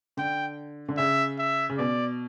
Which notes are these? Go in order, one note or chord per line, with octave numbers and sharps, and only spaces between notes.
D3 G5
D3
C#3 E5
E5
C#3
B2 D5